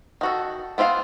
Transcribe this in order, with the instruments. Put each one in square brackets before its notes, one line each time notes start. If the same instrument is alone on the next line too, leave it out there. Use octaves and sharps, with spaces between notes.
[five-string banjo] D#3 F#4 A4
B3 C4 F4 E5 F5